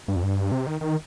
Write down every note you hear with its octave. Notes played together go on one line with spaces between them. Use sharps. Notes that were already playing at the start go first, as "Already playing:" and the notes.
G2
F2
G2
C3
D#3
D#3